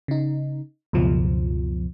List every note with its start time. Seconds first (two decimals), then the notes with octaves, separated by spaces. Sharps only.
0.08 C#3 D#4
0.93 C#2 F#2 B2 F3